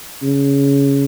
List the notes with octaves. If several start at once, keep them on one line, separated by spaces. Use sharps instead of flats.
C#3